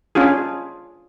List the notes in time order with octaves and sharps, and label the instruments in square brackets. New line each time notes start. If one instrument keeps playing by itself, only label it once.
[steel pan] C#4 D4 F4 G#4